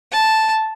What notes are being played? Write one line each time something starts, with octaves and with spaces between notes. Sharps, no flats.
A5